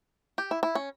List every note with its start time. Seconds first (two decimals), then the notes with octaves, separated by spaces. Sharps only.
0.38 G4
0.51 E4
0.63 E4
0.75 C#4